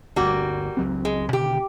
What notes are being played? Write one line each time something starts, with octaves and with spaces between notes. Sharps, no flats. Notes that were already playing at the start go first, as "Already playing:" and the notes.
G1 D2 G3 A#3 F#4
C#2 F#3 C4
G#3
B2 D3 D#3 G4